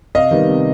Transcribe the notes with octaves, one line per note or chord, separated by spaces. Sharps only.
C3 D#5 F5
D#3 G3 B3
C3